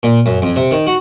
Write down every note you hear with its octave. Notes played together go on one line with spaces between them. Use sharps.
A#2
F#2
F2
C3
D#3
F#4